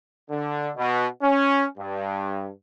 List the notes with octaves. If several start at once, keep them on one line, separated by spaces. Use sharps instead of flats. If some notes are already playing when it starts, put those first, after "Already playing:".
D3
B2
C#4
G2